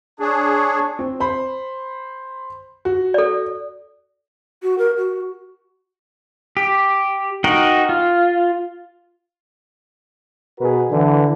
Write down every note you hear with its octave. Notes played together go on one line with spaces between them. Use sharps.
D4 G#4 C#5 A5 C#6
C4
C5 B5
F#4
A4 D5
F#4
A#4
F#4
G4
D#4 F#4 A#4 G5
F4
B2 F#4 G#4 A#4 B4
D3 E3